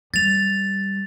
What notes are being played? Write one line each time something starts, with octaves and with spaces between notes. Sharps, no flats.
G3 A6 F7